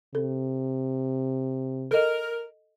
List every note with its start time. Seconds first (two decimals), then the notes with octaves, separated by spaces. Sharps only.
0.15 C3 A4
1.91 A4 A#4 D#5